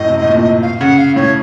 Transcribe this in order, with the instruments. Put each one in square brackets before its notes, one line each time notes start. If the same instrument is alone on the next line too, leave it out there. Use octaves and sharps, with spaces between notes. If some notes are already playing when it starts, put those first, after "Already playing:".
Already playing: [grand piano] F#2 A2 [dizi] D#5
[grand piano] C3
A2
A#2
C3
[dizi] F5
[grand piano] C#3 [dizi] F#5
[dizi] F5
[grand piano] A2 [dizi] C#5